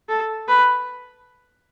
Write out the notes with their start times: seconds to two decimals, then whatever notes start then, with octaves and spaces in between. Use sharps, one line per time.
0.09 A4
0.48 B4